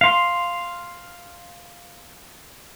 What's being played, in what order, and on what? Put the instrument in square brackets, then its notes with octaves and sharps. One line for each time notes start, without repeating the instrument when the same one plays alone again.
[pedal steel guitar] F5 C6